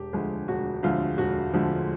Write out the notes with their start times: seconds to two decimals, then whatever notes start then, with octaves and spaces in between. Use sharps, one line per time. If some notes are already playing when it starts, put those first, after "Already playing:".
Already playing: E1 G4
0.13 D2 D3 F3 G#3
0.48 E1 F#4
0.83 D2 D3 F3 G#3 F4
1.18 E1 F#4
1.53 D2 D3 F3 G#3